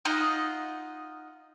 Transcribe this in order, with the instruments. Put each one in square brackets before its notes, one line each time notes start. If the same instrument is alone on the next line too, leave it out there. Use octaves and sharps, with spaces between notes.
[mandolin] D#4 F4 D#5 F#5